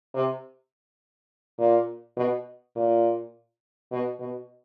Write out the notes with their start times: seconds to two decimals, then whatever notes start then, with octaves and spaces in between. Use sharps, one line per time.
0.14 C3
1.59 A#2
2.16 B2
2.76 A#2
3.92 B2
4.20 B2